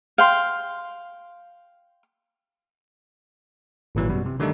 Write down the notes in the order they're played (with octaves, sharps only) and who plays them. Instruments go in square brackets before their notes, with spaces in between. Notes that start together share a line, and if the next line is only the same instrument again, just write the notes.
[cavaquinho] F5 G5 C6
[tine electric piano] G#1 A#2 E3 F#3
F#2 B2 G3
C3
D3 D#3 G3 A3 D#4 A4